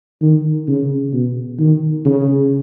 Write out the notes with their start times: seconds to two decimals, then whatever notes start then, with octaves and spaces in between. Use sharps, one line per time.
0.21 D#3
0.68 C#3
1.13 B2
1.59 D#3
2.05 C#3